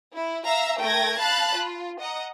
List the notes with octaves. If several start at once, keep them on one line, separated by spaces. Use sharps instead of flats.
E4
E5 F5 A#5 E6
A3 A#4 G5 G#6 A#6
F5 A5 B5 F#6 A6
F4
D#5 F#5 A#5